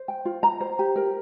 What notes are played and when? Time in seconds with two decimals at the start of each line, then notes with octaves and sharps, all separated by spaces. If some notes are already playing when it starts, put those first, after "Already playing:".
Already playing: C5
0.08 G5
0.25 F4
0.43 A#5
0.61 C5
0.79 G4
0.96 A#4